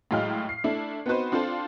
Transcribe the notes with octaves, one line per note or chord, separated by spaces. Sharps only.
A2 F#3 G#3 F5 G5 F6
C7
A3 D4 E4
B3 C4 D#4 F#4 B4 C5
C4 D4 F4 A4 C5